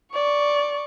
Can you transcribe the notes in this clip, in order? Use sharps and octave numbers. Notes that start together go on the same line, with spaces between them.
D5 C#6